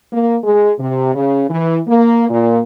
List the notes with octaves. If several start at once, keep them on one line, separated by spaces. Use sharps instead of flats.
A#3
G#3
C3
C#3
E3
A#3
A#2